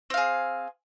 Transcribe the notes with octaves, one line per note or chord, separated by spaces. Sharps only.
C4 G#4 F5